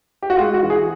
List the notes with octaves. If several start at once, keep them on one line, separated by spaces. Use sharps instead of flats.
G4
F#4
G#3 F4
F#4
E3
G#4